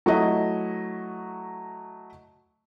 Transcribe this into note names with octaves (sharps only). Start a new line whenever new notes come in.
F#3 A3 E4 D#5